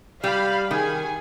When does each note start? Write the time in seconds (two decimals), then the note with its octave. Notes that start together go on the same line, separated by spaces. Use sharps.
0.24 G3 F5 B5
0.71 D#3 G#4 G#5